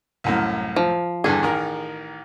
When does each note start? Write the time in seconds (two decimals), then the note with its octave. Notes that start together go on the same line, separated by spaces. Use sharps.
0.24 C2 F#2 A2
0.76 F3
1.24 E2 G2 D3 G#4
1.42 A1 D#3 A#4